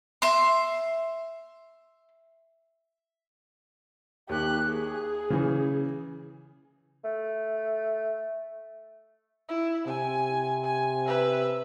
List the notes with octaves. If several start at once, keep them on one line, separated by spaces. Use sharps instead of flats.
E5 C6
D#2 G4 F#6
G#4
C#3 E3
A3
E4
C3 G#5
G#5
B4 E5